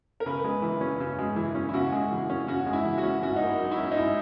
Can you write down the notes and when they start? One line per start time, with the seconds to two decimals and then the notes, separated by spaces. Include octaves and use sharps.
0.20 A#4
0.26 C#3 B4
0.44 G#3
0.62 E3
0.81 C#4
1.00 C#3
1.19 G#3
1.36 E3
1.55 C#4
1.69 E4
1.74 C#3 F#4
1.92 G#3
2.11 E3
2.30 C#4
2.48 C#3 F#4
2.66 G#3
2.73 E4
2.85 E3
2.98 F#4
3.03 C#4
3.23 G#2 F#4
3.36 A#3 D#4
3.46 E4
3.59 F#3
3.71 E4
3.78 C#4
3.91 D#4
3.97 G#2 E4